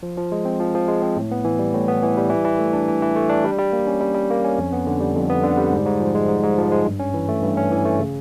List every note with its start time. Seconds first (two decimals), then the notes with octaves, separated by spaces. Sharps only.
0.03 F3
0.18 F3
0.32 G#3
0.45 C4
0.60 F3
0.75 F3
0.88 G#3
1.02 C4
1.17 A2
1.31 B3
1.44 E3
1.59 G3
1.74 A2
1.88 B3
2.03 E3
2.17 G3
2.30 E3
2.45 E3
2.59 A3
2.73 D4
2.88 E3
3.02 E3
3.16 A3
3.29 D4
3.44 G3
3.59 G3
3.73 A#3
3.87 C#4
4.01 G3
4.15 G3
4.30 A#3
4.44 C#4
4.58 F2
4.73 B3
4.87 D3
5.00 G3
5.15 F2
5.30 B3
5.43 D3
5.58 G3
5.73 G#2
5.86 G#2
6.00 F3
6.15 G#3
6.29 G#2
6.44 G#2
6.58 F3
6.71 G#3
6.86 G2
6.99 C#4
7.14 E3
7.29 A3
7.43 G2
7.57 C#4
7.72 E3
7.85 A3
7.99 C#3